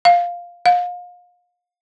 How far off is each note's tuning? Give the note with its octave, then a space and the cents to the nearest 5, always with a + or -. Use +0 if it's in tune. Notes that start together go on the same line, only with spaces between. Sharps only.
F5 +5
F5 +35